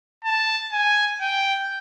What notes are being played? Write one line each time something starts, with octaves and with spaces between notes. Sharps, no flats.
A5
G#5
G5